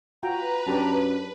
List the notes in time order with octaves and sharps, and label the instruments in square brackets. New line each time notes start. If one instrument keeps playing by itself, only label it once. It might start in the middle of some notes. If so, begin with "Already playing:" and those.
[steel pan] F4 F#4 G5 [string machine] B4 [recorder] A#5
[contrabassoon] F#2 [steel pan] D4 G4 A5